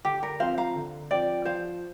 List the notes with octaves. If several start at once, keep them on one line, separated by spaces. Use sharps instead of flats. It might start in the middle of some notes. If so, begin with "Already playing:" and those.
D3 G4
A#4
F3 C4 F4 C5 F5
F5 A#5
D3
F3 C4 F4 D5 G5
F3 C5 F5